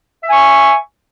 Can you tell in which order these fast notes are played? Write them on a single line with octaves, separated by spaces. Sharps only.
E5 G#5 C#6